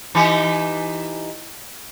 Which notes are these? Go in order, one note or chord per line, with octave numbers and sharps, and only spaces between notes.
E3 D#4 G4